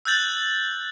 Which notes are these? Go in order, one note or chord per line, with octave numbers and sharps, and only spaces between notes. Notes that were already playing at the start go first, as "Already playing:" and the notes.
E6 F#6 G6 A6 F#7